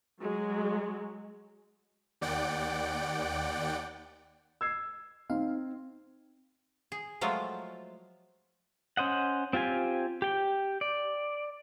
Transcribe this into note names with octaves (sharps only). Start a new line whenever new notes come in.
F#3 G#3
D#2 D5 F#5 G5 D7
E6 G#6 C7
C4 D#4 F5
G#4
F3 F#3 G#3 A3 F4
C#4 C5 D#5 F#5
C4 F4 G4 G#5
G4 G5
D5